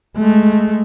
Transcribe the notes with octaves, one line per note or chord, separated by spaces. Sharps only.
G#3 A3